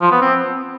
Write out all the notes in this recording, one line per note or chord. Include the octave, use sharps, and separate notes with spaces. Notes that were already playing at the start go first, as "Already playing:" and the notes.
F3
B3
C4